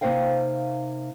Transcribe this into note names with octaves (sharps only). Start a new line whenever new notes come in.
C3 A#3 D#4 C5 F5 G5